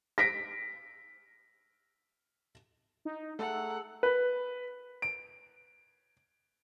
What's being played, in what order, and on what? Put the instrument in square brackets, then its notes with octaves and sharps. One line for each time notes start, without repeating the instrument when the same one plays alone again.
[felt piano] A#6 B6 D7
[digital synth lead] D#4
[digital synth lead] A3 [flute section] G#4 A#5 E6 [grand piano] A4 [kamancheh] F#5
[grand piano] B4
D7